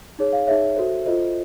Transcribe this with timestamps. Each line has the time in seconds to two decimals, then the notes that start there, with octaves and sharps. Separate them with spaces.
0.19 D#4 G#4 C#5
0.33 F5
0.47 D#4 G#4 C#5 E5
0.76 F#4 A4 C5
1.06 F4 A4 C5 D#5